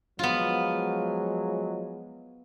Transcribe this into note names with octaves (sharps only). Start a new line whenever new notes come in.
F3 F#3 G#3 B3 F4